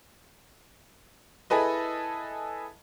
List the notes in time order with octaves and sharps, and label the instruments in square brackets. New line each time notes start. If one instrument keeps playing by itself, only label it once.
[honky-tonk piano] E4 G#4 A4 B4 D#5